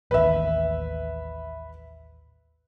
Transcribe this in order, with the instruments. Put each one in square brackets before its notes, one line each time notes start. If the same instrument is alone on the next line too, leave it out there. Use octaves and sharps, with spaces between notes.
[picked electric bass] A1 D#2 [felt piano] B4 E5